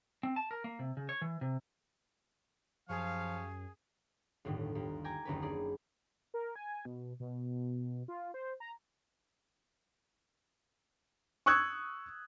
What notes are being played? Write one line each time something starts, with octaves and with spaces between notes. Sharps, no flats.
C4
A5
A#4
A#3
C3
C#3
C#5
E3
C3
F#2 F3 G4 G#4 C#5 F5
G1 D#2 A2 D3 D#3
D#2 G3
G5 G#5 A#5 D6 G#6
F#1 D#2 D3 C#4 A#4 B4
D#4 G#4 D5
A#4
G#5
B2
B2
F4
C5
A#5
C#6 D#6 E6 F#6 G#6